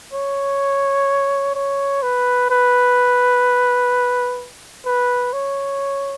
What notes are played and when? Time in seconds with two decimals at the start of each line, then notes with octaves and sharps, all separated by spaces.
0.13 C#5
1.55 C#5
2.02 B4
2.50 B4
4.86 B4
5.33 C#5